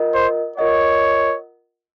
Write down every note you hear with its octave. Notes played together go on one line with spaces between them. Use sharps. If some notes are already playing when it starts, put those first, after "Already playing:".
Already playing: F4 A#4 D#5 F#5
C5
F4 A#4 C#5 D#5 F#5